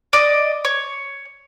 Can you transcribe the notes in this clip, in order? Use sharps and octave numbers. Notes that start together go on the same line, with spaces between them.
D5 D#5
C#5